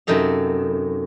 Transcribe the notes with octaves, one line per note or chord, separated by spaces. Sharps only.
F#2 C3 D#4 A4 F5